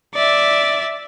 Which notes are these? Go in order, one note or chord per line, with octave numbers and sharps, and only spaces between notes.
D5 E5